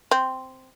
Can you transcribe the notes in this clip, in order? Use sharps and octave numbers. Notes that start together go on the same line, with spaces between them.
C4